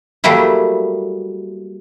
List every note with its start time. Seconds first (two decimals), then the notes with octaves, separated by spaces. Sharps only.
0.24 F#3 G3 A3 A#3 E4